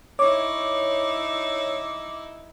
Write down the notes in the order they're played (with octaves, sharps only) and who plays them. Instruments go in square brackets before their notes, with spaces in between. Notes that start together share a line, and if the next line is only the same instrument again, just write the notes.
[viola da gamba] D#4 E4 [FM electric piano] C#5 [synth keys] D6